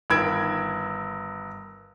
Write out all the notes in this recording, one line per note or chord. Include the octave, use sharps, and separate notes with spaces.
G1 D#3 B5 E6 G#6 D7